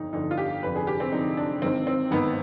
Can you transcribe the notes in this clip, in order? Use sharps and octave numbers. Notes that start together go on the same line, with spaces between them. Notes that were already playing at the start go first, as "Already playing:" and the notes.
Already playing: G1 F2 D3 D#4
G1 F2 D3 D#4
F4
G4
F1 F2 D3 B4
G#4
G4
C4
F1 F2 D3 D#4
D4
G#1 G#2 D#3 C4
C4
G#1 G#2 D#3 B3